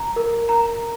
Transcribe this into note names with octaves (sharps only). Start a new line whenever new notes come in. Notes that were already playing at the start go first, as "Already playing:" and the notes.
Already playing: A#5
A#4
A#5